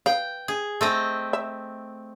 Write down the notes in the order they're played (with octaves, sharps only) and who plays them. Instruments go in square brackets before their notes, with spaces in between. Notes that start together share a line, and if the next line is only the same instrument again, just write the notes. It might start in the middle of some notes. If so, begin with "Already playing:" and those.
[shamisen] B4 F5 [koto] G5
[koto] G#4
A3 C4 D#5
[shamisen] E5